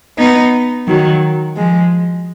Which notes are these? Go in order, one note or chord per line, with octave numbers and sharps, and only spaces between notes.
B3 D#4
D#3 F#3
F3 G#3